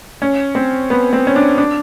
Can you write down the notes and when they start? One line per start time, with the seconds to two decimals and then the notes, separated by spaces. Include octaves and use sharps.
0.22 C#4
0.55 C4
0.90 B3
1.13 C4
1.27 C#4
1.36 D4
1.58 D4